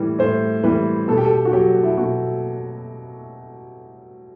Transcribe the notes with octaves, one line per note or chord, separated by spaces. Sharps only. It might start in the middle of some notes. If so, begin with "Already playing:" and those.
Already playing: A2 E3 G3
A2 C5
E3 G3 B4
B2 A4
G4
A4
F#4
F#3 G4
E4
B2 F#4